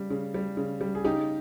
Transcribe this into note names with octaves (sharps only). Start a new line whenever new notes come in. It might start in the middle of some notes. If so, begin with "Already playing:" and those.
Already playing: C#3 G3
C#3
G3
C#3
G3
G#4
C#3 D#4 G4